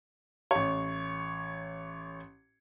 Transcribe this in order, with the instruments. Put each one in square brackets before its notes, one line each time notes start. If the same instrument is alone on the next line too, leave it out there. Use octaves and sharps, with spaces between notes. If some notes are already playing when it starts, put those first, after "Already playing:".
[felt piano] A1 C#5